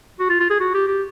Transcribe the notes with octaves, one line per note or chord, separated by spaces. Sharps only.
F#4
F4
F4
G#4
F#4
G4
G4